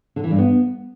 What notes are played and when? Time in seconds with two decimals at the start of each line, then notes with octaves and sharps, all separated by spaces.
0.16 D3
0.24 E3
0.31 G2
0.38 B3